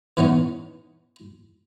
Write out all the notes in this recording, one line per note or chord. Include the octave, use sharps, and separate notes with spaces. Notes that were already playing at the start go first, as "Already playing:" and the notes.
E3 B3 C#4 D#4